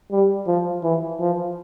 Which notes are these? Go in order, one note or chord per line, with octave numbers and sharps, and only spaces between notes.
G3
F3
E3
F3